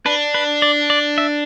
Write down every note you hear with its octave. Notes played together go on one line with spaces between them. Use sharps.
D4 B4
B4
D5
D5
E5